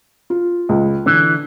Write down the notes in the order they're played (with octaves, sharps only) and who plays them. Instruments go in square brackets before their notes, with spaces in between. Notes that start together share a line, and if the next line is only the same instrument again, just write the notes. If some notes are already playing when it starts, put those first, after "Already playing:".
[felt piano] F4
C#2
[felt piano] D3 [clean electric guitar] E3